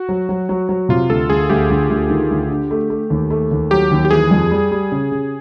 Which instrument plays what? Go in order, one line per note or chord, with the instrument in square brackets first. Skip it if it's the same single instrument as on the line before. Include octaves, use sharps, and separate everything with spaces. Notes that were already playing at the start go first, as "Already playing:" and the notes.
Already playing: [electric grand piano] F#4
[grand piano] F#3
F#3
F#3
F#3
[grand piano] C3 [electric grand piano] F4
[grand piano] D2 [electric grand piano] A4
[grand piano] D2 [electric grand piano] G#4
[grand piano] D2 [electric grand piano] G4
[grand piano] D2
D2
D#3
D2
D3
A3
A3
D#2
A3
D#2
[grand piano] F#3 [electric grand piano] G4
[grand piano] D#2
[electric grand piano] G4
[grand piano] E3 [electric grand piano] G#4
[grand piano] F2
G3
G3
C#3
C#3